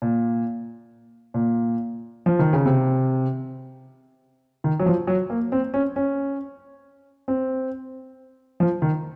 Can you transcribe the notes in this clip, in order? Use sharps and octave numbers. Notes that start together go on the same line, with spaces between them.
A#2
A#2
F3
D#3
C#3
C3
D#3
F#3
F3
F#3
A#3
C4
C#4
C#4
C4
F3
D#3